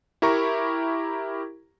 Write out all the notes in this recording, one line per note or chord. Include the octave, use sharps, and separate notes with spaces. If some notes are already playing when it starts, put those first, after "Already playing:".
E4 G4 A#4 A#5 C#6